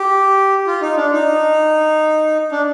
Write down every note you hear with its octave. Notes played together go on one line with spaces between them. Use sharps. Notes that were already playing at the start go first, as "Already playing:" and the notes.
Already playing: G4
F4
D#4
D4
D#4
D4